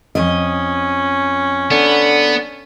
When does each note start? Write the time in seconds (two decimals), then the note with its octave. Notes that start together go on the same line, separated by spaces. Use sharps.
0.15 F2 C#4 D#5
1.71 D3 B3